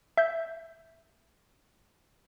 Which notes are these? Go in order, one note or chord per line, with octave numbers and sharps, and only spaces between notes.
E5 G6